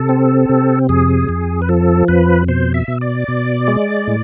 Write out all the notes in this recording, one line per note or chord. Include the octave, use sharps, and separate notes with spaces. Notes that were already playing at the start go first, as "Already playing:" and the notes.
Already playing: C3 A4
C4
C3
F2 G#4
F2
B4
F3 A4
F2 B4
B2 C5
E5
B2
D5
B2
G#3
A2